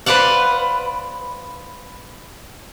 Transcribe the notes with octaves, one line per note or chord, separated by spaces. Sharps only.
B4 C5 D5 F5 F#5